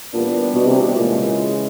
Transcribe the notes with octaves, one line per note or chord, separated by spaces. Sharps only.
A#2 E3 G3 B3 D4 G4
B2
C3
B2
A#2 C#3 E3 G#3